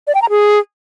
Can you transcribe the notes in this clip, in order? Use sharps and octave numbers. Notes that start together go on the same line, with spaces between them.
D5
G5
A#5
G#4